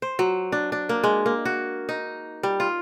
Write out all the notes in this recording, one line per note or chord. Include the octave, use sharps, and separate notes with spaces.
C5
F#3
D4
D4
A#3
G#3
A#3
F#4
D#4
G3
F4